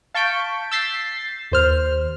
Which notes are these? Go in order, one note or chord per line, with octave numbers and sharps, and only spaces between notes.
F5 A5 C#6 G6 B6 D7
E6 G6 A6 B6 C7
D#2 C5 F6